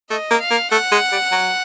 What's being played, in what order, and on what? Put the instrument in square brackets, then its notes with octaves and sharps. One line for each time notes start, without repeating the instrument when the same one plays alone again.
[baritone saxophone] A3 [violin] D#5
[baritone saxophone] A#3
[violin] F5
[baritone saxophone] A#3
[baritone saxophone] A3 [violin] F#5
[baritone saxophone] G#3
G3
F#3